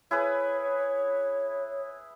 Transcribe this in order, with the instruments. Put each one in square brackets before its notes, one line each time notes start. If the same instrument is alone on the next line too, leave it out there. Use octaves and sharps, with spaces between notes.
[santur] E4 G#4 B4 [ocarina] C#5